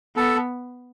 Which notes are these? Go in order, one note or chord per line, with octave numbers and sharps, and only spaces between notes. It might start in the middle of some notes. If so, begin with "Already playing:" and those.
B3 A4